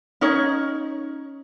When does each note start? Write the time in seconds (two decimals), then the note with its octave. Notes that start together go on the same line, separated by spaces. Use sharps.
0.21 C#4 D#4 C#5